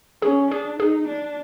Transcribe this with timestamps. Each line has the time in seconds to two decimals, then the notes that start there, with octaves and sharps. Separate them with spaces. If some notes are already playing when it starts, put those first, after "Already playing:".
0.22 C#4 G#4
0.51 D4 G#4
0.80 D#4 G#4
1.08 D4